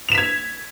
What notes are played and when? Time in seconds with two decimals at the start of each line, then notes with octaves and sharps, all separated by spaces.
0.09 F7
0.12 E7
0.15 B6
0.18 G#6